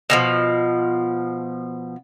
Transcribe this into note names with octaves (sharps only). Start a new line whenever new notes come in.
B2 D#3 F3